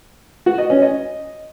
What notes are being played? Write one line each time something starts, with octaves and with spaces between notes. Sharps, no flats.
F#4
D#5
C#4
D#5